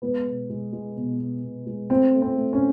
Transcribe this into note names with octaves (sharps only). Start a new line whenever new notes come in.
G#3 B3
B2
G#3
G#3
B2
B2
B2
G#3
A3 C4
A3
C4
A3
C#4